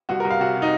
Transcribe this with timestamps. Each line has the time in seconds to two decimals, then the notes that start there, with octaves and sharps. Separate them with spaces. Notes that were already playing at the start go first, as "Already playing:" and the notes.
0.09 C2 F#4
0.20 A#4
0.25 C2
0.31 F5
0.40 C3 F#4
0.56 C3
0.62 D#4